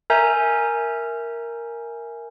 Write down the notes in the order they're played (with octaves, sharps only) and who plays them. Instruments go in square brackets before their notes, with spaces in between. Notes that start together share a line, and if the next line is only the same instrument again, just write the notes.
[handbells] A#4 E5 G#5 A#5 G6